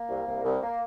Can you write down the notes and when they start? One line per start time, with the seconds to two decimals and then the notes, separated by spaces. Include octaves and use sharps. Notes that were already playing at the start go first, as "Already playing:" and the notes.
Already playing: A#3
0.09 C2
0.27 C2
0.44 C2
0.63 A#3